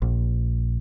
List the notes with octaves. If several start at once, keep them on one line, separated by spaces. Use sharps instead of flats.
A#1